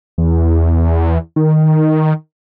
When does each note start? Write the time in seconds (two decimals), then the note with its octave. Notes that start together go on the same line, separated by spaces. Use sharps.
0.18 E2
1.36 D#3